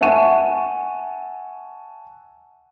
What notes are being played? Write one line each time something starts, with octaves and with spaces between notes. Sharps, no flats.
E5 F#5 G#5 A5 C#6 D#7